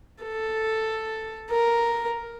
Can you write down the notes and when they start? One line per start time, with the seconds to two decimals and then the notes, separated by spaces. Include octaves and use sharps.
0.23 A4
1.51 A#4